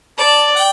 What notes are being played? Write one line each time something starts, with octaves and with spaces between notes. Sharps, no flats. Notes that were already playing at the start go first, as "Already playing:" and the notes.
D5 A5
G5